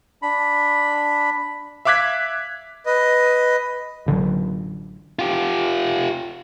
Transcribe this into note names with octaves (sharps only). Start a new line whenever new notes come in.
D4 B5
E5 F5 D6 F#6 G#6 B6
B4 D#5
A1 D3 D#3 F#3
F4 G4